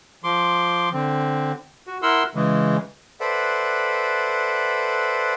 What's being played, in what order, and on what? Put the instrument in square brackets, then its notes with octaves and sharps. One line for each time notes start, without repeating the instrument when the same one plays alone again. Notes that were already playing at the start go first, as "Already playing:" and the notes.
[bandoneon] F3 C6 D6
D3 C4
F#4
E4 A#4 F#5 C6 E6
C#3 E3 G#3
[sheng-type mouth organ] A4 B4 C5 D5 E5 F#5